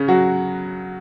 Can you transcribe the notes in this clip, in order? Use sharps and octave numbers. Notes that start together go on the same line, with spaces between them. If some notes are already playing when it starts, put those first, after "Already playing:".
Already playing: C#3 C#4
F#3 F#4